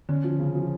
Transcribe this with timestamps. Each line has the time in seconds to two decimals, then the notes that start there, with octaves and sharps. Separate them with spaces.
0.09 D3 C#4
0.24 F3
0.39 C#3
0.55 F3